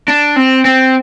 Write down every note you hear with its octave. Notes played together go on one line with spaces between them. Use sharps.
D4
C4
C4